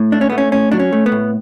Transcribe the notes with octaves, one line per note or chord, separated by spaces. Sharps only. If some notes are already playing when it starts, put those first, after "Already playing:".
Already playing: A2
A3 D4
C#4
A3 B3
C#4
A2 C#4
F#3 D4
C#4
A3
B3
A2